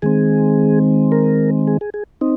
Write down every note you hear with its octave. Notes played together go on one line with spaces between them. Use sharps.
D#3 G#3 C4 G#4
A#4
G#4
G#4
G#4
C4 D#4